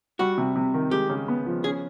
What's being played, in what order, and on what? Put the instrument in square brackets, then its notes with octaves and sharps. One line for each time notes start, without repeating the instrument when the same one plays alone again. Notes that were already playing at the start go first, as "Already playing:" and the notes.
[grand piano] G3 [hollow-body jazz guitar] F#4
[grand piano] C3
C3
D#3
[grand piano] G#3 [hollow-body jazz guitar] G4
[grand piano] C#3
B3
F3
[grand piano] C#4 [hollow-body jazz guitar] G#4